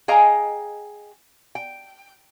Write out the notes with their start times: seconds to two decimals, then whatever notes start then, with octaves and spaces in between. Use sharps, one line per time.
0.08 G#4 D#5 F5 G5 G#5 A#5
1.55 G5